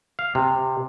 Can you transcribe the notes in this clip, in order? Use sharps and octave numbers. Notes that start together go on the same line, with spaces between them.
F5
C3